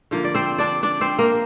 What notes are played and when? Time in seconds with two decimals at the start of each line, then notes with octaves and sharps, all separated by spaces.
0.11 D3 F3 A#3
0.24 D5
0.34 C4 C5
0.58 D4 D5
0.83 D4 D5
1.01 C4 C5
1.19 A#3 A#4